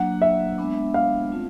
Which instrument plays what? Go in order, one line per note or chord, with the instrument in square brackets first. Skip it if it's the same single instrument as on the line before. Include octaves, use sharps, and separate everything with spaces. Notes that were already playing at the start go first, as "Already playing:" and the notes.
Already playing: [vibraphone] F#3 A#3 D4 [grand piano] F#5
[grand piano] E5
[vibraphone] G#3 B3 D4
[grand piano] F5
[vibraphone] A3 C4 F4